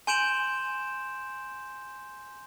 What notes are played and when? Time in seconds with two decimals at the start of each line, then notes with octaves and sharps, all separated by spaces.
0.07 G#5 C6 G6 D7 E7 F#7